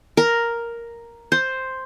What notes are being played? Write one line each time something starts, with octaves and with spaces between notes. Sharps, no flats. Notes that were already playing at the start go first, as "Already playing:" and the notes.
A#4
C5